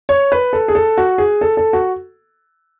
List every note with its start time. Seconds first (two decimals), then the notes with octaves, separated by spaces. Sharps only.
0.09 C#5
0.32 B4
0.53 A4
0.68 G#4
0.75 A4
0.97 F#4
1.18 G#4
1.41 A4
1.57 A4
1.73 F#4